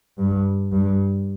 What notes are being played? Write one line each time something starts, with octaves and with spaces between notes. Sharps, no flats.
G2
G2